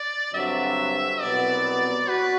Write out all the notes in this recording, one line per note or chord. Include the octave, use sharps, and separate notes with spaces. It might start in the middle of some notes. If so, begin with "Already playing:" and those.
Already playing: D5
G2 D3 F#3 C4 F#4 E5
C2 B2 F#3 B3 D5
F#4 B4